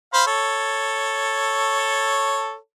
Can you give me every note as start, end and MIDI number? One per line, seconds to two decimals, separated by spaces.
0.14 0.24 72
0.14 0.24 77
0.14 0.24 83
0.27 2.56 69
0.27 2.56 73